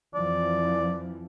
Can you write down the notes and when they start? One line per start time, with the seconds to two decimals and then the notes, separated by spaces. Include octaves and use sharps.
0.15 F2 E3 F3 D5